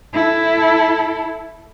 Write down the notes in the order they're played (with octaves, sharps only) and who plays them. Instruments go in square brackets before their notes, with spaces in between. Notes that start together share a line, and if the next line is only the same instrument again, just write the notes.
[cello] E4 A4